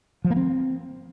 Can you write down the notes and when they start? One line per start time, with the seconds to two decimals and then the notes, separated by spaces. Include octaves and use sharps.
0.25 F3
0.30 A#3
0.36 C4